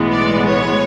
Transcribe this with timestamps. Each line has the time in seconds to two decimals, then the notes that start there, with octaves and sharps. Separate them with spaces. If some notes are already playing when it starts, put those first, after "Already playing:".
Already playing: B1 A2 E3 G#3 B3
0.11 D5
0.46 C#5